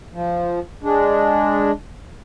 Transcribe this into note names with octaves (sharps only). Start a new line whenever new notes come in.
F3
G#3 D4